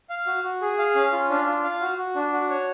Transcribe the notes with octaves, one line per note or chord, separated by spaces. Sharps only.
F5
F#4
F#4
G#4
F5
C#4
F4
D4
F4
F5
F#4
F#4
D4
F#4
C#5